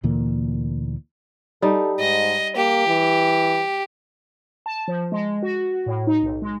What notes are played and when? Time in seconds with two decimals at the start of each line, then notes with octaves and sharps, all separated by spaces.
0.03 D2 A#2 E3 A#3
1.62 G3 D#4 A4
2.00 G#2 D#5
2.56 A#3 G4
2.87 E3
4.66 A5
4.88 F3
5.12 G#3
5.43 F#4
5.86 A2
6.07 D#4
6.22 B1
6.42 G#3